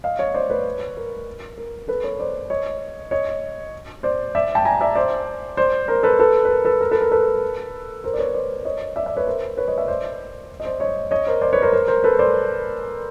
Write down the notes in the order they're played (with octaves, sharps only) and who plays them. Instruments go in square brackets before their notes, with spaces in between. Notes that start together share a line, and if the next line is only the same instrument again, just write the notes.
[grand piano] D#5 F5
C#5 D#5
C5 D5
B4 C#5
A#4
A#4
A4 B4
B4 C#5
C5 D5
C#5 D#5
C#5 D#5
C5 D5
D5 E5
G5 A5
G#5 A#5
D5 E5
C5 D5
C5 D5
A#4 C5
A4 B4
A4 B4
B4
A#4
A4 B4
A#4
A4 B4
A#4
A4 B4
A#4 C5
D5
B4 C#5
C5 D5
C#5 D#5
D5 E5
D5 E5
B4 C#5
A#4 C5
B4 C#5
C#5 D#5
D5 E5
C5 D5
D#5
C5 D5
C#5 D#5
C#5 D#5
A#4 C5
C5 D5
B4 C#5
A#4 C5
A#4 C5
A#4 C5
A4 B4
C5 D5